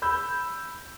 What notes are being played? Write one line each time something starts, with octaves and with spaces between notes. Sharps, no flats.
B5 E6 G6